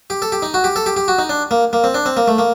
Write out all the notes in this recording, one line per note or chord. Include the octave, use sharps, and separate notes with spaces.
G4
A4
G4
D#4
F#4
G4
A4
G4
G4
F#4
D#4
D4
A#3
A#3
C4
D4
C4
A#3
A3
A#3